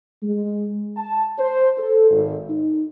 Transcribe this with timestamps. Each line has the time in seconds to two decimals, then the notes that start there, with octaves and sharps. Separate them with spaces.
0.23 G#3
0.97 A5
1.39 C5
1.78 A4
2.11 G#1
2.50 D#4